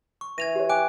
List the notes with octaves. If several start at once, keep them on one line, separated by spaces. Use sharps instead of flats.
C#6
E3 G#6 A#6 D#7 F7
G4 C#5
G5 G#5 D6 F#6 D7